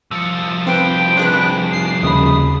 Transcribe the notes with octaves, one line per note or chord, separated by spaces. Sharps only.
C2 F3 E6 C#7
C4 B4 C5 G5
D4 G#4 B4
C7
D#2 C#3 B5 D#6